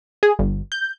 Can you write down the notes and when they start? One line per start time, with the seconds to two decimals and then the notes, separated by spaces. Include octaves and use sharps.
0.23 G#4
0.39 G1
0.72 G6